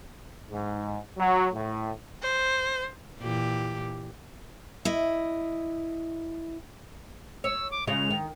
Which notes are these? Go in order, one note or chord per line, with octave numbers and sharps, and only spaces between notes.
G#2
F#3
A2
C5
A#2 E3 G4
E4 D#5
C#5 E6
D6
C#3 G#3 F4 F7
D#3